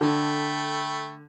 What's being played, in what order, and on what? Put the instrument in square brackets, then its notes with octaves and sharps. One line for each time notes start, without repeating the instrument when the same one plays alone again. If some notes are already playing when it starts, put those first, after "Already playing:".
[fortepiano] D3 [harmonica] A3 G5 B5